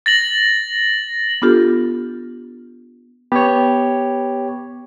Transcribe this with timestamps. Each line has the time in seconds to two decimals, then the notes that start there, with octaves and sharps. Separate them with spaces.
0.06 A6 A#6 F#7
1.42 B3 D4 F4 G4 A4
3.32 B3 G4 C#5